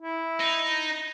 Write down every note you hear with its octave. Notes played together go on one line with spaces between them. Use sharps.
E4
D#4